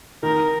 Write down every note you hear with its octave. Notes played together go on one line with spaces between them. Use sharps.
D#3 A#4